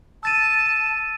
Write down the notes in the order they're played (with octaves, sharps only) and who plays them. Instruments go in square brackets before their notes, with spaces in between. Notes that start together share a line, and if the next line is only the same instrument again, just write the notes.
[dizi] A5 [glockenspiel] E6 A6 D#7